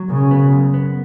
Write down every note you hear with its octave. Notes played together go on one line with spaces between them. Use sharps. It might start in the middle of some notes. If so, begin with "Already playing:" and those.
Already playing: F#3
F#2 C#3
B3
F#2
B3